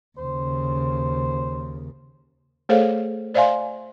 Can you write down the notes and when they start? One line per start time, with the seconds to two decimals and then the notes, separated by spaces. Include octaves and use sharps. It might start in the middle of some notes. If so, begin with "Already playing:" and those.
0.18 D#2 C#3 C5
2.69 A3 G#4 A4 C5 C#5 F5
3.34 C5 D5 E5 F5 G#5 C6